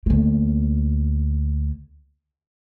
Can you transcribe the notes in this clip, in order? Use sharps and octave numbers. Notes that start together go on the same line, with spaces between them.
D2 A#3